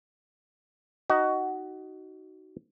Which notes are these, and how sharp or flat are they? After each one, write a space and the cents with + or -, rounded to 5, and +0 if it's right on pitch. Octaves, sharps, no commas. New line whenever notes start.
D#4 +0 F#4 +20 D#5 -5